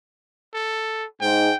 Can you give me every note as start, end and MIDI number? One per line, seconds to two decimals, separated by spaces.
0.54 1.05 69
1.21 1.48 44
1.21 1.56 79